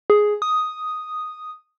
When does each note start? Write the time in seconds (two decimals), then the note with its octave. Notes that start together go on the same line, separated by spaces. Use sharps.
0.10 G#4
0.42 D#6